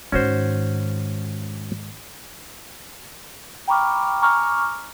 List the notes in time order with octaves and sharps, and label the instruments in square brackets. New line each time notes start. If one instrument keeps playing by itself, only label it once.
[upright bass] G#2 D#3 [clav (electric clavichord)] C#4 F#4 C5
[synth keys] G5 A#5 B5 C#6 D6 F6
G#5 A#5 C#6 D6 F6